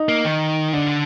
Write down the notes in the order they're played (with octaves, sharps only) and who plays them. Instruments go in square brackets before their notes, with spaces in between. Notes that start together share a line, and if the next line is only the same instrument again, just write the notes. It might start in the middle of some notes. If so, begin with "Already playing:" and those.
Already playing: [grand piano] D#4
[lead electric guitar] A#3
D#3
[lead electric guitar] D3 [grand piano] D4